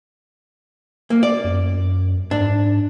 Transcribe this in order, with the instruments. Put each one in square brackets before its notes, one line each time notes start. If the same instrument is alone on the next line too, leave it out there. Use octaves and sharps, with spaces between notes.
[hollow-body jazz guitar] A#3
D5
[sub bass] F#2
[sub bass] G#2 [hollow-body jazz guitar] D4